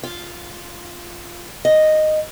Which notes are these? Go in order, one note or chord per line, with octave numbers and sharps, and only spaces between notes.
F4
D#5